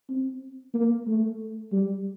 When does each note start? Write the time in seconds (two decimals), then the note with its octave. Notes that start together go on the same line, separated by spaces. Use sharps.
0.09 C4
0.74 A#3
1.07 A3
1.72 G3